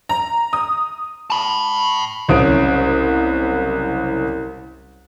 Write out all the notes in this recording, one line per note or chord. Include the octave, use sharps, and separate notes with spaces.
A#5
D#6
A5 B5
F#1 C2 C#4 D#6 D7